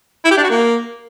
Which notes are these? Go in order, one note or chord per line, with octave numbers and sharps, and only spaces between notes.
E4
G4
D4
F#4
A#3